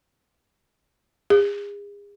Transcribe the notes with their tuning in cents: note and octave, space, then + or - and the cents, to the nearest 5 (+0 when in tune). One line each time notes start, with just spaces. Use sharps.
G#4 -35